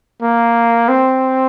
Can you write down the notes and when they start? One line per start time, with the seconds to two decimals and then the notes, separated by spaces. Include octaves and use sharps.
0.22 A#3
0.88 C4